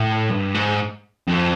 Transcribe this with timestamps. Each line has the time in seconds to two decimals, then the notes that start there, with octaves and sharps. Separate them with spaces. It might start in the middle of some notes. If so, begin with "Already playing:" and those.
Already playing: A2
0.30 G2
0.54 G#2
1.27 F2